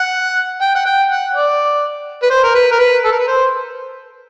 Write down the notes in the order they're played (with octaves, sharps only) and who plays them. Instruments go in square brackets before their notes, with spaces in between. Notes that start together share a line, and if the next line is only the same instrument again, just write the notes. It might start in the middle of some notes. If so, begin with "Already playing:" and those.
Already playing: [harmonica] F#5
G5
F#5
G5
F#5
D5
B4
C5
A#4
B4
A#4
B4
A4
A#4
B4
C5